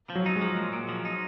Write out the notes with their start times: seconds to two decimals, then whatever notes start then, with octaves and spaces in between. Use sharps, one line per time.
0.10 F3
0.15 F#3
0.26 D#4
0.36 G#3
0.41 F3
0.57 A#2
0.73 A#2
0.89 F3
1.05 D#4